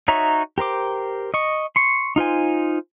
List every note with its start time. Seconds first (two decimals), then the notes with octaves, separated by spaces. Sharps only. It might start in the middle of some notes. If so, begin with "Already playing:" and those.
0.08 D#4 F#4 C#5 E5 A#5
0.58 G4 A#4 C5 D6
1.34 D#5 C#6
1.76 C6 C#6
2.16 D#4 F4 C5 G#5